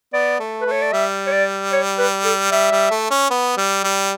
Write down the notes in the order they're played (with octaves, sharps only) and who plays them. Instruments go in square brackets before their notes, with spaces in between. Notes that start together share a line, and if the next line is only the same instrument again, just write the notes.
[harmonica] B3 [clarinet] D5
[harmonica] A3
[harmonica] A3 [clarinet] B4
[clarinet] C#5
D5
[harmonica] G3 [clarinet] E5
[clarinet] C#5
D5
C#5
B4
A4
[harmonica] G3 [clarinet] E5
[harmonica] G3
A3
C#4
B3
G3
G3